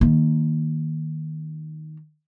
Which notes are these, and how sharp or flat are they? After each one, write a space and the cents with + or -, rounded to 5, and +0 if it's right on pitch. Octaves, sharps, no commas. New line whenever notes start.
D#3 +0 A#3 +0